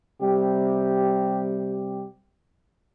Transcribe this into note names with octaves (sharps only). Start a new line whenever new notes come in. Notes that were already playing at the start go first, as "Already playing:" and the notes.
C3 G3 G4